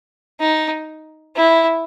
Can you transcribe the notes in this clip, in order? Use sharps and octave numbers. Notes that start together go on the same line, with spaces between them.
D#4
E4